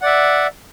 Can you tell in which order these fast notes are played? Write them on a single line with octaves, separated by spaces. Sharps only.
F#5 D5 E5